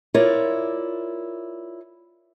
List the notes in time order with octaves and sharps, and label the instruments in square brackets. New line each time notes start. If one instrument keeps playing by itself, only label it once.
[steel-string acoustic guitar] E4 F4 A#4 C#5 D5